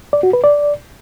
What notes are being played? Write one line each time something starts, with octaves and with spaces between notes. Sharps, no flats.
D5
F#4
B4
D5